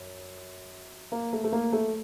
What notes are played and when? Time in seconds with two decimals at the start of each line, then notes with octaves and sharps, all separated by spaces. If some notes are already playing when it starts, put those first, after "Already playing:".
Already playing: F#2
1.12 A#3
1.33 A3
1.44 A3
1.52 A#3
1.73 A3